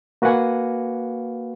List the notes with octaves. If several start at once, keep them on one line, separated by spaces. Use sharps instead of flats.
A#3 F#4 B4 F5 F#5 G#5